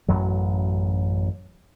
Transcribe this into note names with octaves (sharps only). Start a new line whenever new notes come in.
A1 F#2 F#3